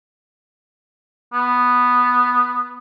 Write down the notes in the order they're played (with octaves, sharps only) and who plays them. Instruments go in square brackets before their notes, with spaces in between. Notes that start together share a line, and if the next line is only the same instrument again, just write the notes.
[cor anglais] B3